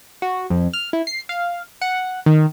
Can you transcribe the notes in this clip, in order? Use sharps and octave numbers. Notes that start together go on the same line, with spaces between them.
F#4
F2
F6
E4
C7
F5
F#5
D#3